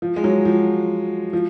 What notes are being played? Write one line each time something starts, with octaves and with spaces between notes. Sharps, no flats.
F3
G#3
F#3
F3
F3